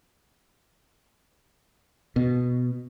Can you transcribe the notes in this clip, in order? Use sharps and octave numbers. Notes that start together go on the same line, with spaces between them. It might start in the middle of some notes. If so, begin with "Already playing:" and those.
B2